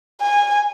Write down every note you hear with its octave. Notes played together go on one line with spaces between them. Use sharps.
G#5